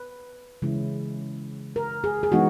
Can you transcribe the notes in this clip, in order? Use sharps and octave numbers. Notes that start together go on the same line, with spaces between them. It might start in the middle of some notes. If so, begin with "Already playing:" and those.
Already playing: B4
C#3 E3 G#3 C#4 E4
A#4
G#4
G#4
E3 G#3 B3 D#4 F#4